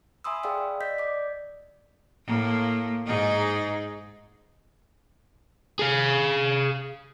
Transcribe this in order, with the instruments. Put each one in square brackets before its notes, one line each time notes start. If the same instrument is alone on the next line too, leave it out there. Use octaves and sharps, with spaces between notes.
[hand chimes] E5 G#5 B5 C6 D#6 E6
G#4 D5 F5 G5 E6
D5 D#5 G6 B6
D5 D6
[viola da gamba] A2 A#3
G#2 D#4 G#4
[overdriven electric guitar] G#4 F5